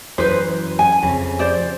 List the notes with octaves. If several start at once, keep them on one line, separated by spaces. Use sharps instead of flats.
F#2 E3 B4 C5
G#5
F2 C#3
C5 D5